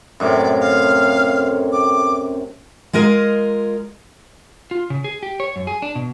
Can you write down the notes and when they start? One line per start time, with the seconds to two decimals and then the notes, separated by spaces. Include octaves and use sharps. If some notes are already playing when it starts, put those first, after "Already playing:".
0.20 F#2 A2 C3 D5
0.61 F5
1.72 D6
2.93 G#3 F4 A#4 D#5
4.71 F4
4.90 C#3
5.04 G#4
5.23 G4
5.40 C#5
5.56 F#2
5.67 G#4
5.82 D4
5.96 B2